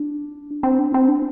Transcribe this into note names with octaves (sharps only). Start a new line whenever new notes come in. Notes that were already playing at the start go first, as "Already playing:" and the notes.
Already playing: D4
C4
D4
C4
D4